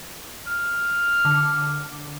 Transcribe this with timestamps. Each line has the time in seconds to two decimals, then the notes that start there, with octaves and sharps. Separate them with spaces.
0.47 F6
1.25 D3